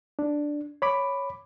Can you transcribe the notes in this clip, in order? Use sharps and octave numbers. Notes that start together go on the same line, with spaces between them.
D4
C#5 B5 D6